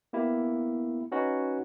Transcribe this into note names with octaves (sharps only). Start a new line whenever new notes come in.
A#3 B3 E4 G4
C#4 D#4 F#4 B4